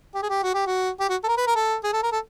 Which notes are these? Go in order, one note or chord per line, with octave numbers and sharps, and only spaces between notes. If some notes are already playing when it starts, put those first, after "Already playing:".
G4
G#4
G4
F#4
G4
F#4
G4
F#4
A4
A#4
B4
A#4
A4
G#4
A4
A#4
A4